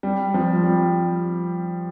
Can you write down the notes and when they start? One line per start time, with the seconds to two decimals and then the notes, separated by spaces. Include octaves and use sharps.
0.03 G3
0.34 F3
0.64 G3